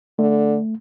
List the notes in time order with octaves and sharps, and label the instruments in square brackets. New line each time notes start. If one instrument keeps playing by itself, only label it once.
[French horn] D3 [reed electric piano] A3